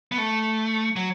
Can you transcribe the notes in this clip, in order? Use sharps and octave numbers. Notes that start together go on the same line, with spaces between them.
B3
A3
F#3